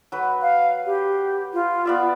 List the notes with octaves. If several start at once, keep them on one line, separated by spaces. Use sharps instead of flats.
F#3 B4
F5
G4
F4
B3 D5 E5